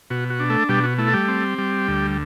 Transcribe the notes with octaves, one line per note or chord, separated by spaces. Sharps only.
B2 F#4
F#4
D4
A3 A4
B2 G3 G4
F#4
A3 E4
A4
G3 G4
C4
G3
D2